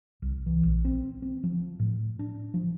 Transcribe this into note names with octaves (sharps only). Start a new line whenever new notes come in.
C2
E3
A#1
C4
C4
F3
A2
D4
F3